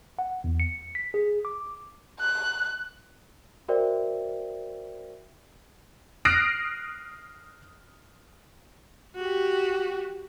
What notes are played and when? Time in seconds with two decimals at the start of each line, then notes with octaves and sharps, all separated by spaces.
0.19 F#5
0.44 E2
0.60 C#7
0.95 B6
1.14 G#4
1.45 D6
2.20 F#6
3.68 F#4 A#4 C5 D5 E5 G5
6.25 D#6 F6 F#6 A#6 C7 D7
9.16 F#4 G4